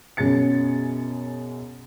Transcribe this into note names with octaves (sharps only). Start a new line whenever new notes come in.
F#2 B2 C#4 G#4 A6 C#7